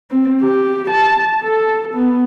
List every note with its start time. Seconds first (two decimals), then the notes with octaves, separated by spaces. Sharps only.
0.11 C4
0.41 G4
0.90 A5
1.42 A4
1.94 B3